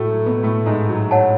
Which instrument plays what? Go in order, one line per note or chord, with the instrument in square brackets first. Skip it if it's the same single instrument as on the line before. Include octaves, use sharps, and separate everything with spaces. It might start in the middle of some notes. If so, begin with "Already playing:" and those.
Already playing: [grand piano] A2 A3 [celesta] F#4 A4
[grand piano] F#3
B2 B3
A2 A3
G#2 G#3
F#3
[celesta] C#5 F#5 A5